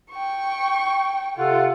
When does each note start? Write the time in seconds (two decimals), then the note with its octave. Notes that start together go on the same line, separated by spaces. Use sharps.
0.11 G5 C#6
1.38 C3 F4 A4 F#5